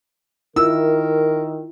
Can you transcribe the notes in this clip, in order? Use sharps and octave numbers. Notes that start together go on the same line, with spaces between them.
D#3 E4 F4 A#4 E6